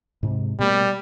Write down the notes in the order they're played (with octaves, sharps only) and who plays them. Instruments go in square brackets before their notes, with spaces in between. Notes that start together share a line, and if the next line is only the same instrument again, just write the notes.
[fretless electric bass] G#2 C3
[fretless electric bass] B2 A3 A#3 [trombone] G3